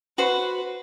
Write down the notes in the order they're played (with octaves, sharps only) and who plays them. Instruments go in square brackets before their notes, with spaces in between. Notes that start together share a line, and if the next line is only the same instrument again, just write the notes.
[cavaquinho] F#4 C5 [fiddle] B4